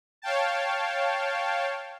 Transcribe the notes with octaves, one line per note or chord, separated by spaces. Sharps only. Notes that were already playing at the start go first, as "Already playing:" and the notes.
C#5 F5 G5 A5